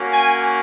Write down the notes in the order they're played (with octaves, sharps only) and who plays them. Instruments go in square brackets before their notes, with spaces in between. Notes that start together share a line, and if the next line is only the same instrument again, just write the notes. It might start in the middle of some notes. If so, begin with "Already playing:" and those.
Already playing: [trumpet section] A#3 C#4 F#4
G#5